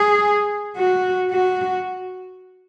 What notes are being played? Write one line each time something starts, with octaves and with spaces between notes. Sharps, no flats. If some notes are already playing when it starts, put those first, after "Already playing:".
Already playing: G#4
F#4
F#4